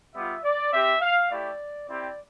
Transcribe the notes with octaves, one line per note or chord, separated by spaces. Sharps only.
G3 B3 F4 E5
D5
C4 G4 E5
F5
A3 E4 G4 D5
C4 E4 G4 D5